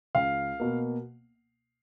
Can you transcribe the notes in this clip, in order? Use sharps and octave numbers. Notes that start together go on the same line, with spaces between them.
C#2 F5
B2 A#3